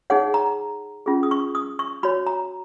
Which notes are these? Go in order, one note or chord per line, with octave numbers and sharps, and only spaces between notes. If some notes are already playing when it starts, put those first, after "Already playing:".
D#4 G#4 C#5 F#5
A#5
C#4 F4 G#4
D#6
C#6
D#6
C#6
F#4 C#5 B5
A#5